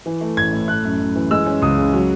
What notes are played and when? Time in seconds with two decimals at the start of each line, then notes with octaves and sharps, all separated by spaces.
0.06 E3
0.21 A3
0.37 A1 G#6
0.53 A2
0.68 A3 F#6
0.84 F#2
1.00 F#2
1.16 E3
1.31 G#3 E6
1.47 C#4
1.62 C#2 D#6
1.78 C#3
1.93 F#3